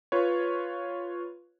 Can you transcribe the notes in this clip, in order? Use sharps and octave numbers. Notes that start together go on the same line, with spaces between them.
F4 B4 C#5